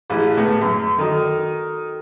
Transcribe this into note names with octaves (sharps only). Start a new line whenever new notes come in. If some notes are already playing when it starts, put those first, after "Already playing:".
A1 E4 G#4
A2 B3
F#2
D#3 D#4 F#4 A4